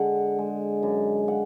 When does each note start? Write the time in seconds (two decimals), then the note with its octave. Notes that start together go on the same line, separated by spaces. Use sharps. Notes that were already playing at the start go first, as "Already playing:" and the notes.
Already playing: D3 G#3 F#5
0.38 G#3
0.83 F#2
1.28 F#5